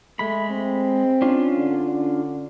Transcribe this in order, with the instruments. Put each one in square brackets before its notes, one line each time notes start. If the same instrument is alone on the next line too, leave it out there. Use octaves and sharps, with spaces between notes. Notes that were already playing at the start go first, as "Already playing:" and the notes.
[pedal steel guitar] G#3 B5 [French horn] A3
[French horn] C4
[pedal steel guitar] C#4 D4 F4
[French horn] D3